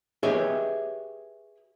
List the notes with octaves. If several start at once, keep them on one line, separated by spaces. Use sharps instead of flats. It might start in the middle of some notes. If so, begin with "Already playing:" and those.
G4 G#4 B4 C#5 D#5 E5